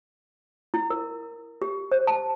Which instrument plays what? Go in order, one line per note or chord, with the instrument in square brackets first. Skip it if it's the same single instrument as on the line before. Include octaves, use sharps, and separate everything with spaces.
[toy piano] E4
A#4
G4
C5
A5